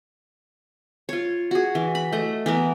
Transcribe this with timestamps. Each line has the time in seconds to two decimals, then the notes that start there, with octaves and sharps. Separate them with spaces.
1.09 F4 C#5
1.51 F#4 G#4
1.75 E3
1.95 B5
2.13 A3 D#5
2.46 E3 B3 A#4